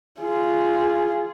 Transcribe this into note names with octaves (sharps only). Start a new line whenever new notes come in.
F4 G#4